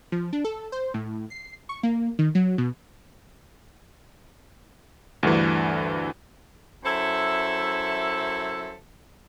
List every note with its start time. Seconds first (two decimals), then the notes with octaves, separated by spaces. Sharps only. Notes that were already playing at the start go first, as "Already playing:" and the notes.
0.12 F3
0.33 D4
0.45 A4
0.72 C5
0.94 A2
1.30 C7
1.69 C#6
1.83 A#3
2.19 D#3
2.35 F#3
2.58 B2
5.23 D2 G2 D3 E3
6.85 F#2 E4 A4 C5 E5